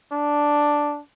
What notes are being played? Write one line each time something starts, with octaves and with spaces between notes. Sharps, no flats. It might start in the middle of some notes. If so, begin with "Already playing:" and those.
D4